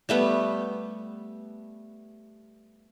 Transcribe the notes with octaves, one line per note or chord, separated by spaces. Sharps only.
G3 A3 B3